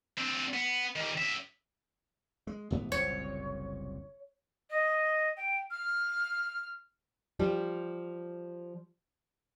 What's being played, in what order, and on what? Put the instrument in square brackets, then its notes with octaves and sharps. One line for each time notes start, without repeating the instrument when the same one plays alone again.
[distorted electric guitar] C4 D4
B3
D#3 G3
C#4 E5
[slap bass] G#3
A1 G#2 B3
[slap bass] F#1 C2 A#2 [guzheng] C#5
[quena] D#5
G5
F6
[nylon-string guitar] F3 G3